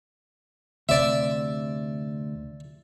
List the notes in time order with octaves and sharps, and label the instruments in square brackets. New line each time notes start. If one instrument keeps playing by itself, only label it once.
[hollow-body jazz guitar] D2 C3 [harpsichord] D5 E5